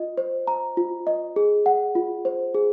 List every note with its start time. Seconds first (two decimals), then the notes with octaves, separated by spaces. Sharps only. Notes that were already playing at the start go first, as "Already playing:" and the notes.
Already playing: F4 D#5
0.18 C5
0.47 A#5
0.77 F4
1.07 D#5
1.36 G#4
1.66 F#5
1.95 F4
2.25 C5
2.54 G#4